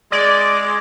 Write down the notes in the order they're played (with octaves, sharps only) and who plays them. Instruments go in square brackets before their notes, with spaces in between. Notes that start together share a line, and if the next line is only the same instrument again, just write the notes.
[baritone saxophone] G#3 [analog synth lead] D5